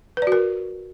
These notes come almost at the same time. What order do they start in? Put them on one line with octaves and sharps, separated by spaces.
B4 D5 F#4 A#4